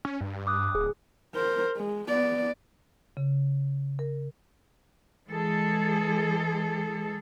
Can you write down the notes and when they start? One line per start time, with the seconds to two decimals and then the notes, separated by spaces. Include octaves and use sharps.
0.05 C#4
0.21 G2
0.47 D6 D#6 F#6
0.75 D1 G#4
1.35 A#4 C5
1.76 G#3
2.08 B3 D5
3.17 C#3
3.99 A#4
5.28 E3 G#3 G#4 A4